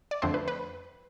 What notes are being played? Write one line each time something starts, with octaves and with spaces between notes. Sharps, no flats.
D5
F2 D3 A3 C4 C5
B4
B4